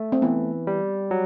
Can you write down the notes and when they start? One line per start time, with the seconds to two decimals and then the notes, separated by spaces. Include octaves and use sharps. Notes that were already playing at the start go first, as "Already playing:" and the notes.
Already playing: A3
0.12 C4
0.22 E3 B3
0.67 G3
1.11 F#3